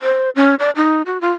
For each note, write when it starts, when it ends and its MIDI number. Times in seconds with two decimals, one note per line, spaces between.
0.01 0.30 72
0.36 0.55 61
0.59 0.70 74
0.76 1.02 63
1.06 1.21 66
1.21 1.31 65